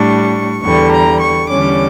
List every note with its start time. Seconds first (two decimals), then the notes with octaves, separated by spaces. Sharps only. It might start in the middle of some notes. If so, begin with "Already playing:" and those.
Already playing: A2 G3 D4 C#6
0.62 E2 D3 G3 C#6
0.91 A#5
1.20 C#6
1.49 E2 D3 G3 C#4 D6